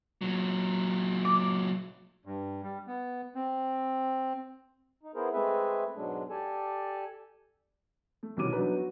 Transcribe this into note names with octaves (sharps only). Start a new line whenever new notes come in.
A#2 F#3
D6
G2
G3
B3
C4
D#4
B3 E4 G#4 A#4 C5
G#3 A3 C4 G#4 B4 E5
G#2 B2 F#3 G#3 D4
G4 A4 D5 G#5 A5
A3
C2 B2 D#3 C#4 D6 D#7
F#3 B3 D4 D#4 F#4 B4
F#4